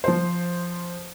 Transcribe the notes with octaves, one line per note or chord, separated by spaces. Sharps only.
F3 C5